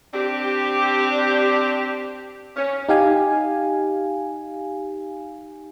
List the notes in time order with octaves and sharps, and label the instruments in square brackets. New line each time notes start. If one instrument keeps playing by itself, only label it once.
[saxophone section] C4 D4 G4
C#4
[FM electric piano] D#4 G4 F5 G#5